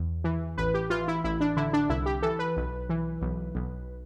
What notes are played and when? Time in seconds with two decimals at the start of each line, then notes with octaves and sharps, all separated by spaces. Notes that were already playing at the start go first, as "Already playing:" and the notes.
Already playing: E2
0.24 E3
0.58 A1 B4
0.74 G4
0.90 E3 F4
1.08 E4
1.24 A1 E4
1.41 D4
1.56 D3 E4
1.73 D4
1.89 C2 E4
2.06 G4
2.22 E3 A4
2.39 B4
2.56 B1
2.90 E3
3.22 B1
3.55 B1